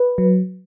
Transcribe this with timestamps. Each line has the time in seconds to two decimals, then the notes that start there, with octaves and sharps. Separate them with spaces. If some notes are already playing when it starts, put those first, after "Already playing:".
Already playing: B4
0.18 F#3